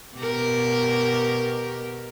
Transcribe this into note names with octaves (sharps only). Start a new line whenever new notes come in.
B2 G4 A#4